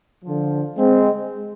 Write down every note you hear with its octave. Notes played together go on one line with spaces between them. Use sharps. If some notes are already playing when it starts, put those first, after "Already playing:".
D3 F3
G#3 C4